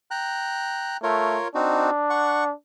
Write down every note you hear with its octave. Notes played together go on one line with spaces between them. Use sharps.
G5 A#5 F#6
A3 F4 A#4 C#5
C4 D4 D#4 F#4
F#5 C#6